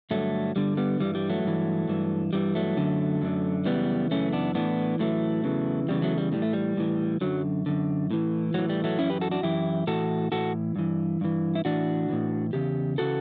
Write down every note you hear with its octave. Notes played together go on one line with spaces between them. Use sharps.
G2 D3 F#3 A3
G2 D3 G3
G3 B3
G2 E3 G3
G3
F#3 A3
G2 E3
G2 E3
G2 E3 G3
F#3 A3
F#2 D3
F#2 D3
F#2 C#3 E3 G3 B3
F#2 C#3 E3 A3 C#4
B3 D4
A2 E3 B3 D4
A2 E3 F#3 A3
E2 C#3 E3
E2 C#3 E3 G3
F#3 A3
G3
A2 E3 G3
A3
G3
A2 E3
F#2 D3 F#3
F#2 D3
A2 E3
A2 E3 F#3
G3
F#3 A3
F#2 E3 C#4 E4
G4 B4
F#4 A4
D4 F#4
F#2 E3 E4 G4
A2 E3 F#4 A4
A2 E3 F#4 A4
G2 E3
G2 E3
E4
A2 E3 D4 F#4
A2 E3
E2 C#3 G4
C#3 E3 F#4 A4